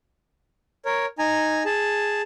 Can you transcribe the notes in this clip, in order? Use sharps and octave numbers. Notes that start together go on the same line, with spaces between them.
A#4 C#5
D#4 G#5 A#5
G#4 A5